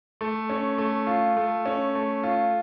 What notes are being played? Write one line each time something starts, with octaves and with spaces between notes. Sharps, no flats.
A3
C#4
A3
F4
A3
C#4
A3
F4